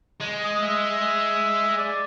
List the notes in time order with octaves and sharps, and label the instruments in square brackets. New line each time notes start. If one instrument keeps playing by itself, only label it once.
[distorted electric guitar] G#3
[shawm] D#6
E5
D5